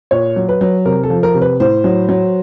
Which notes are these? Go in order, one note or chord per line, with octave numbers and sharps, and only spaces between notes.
A#2 C#5
F#3
B4
F#3
C3 A#4
A4
F3
A#4
C3
B4
A2 C5
F#3
F#3